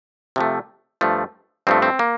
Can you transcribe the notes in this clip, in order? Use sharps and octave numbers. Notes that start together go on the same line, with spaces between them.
C3 F3 A3
G2 F3 A3
G2 F3 A3 C4
C4
A#3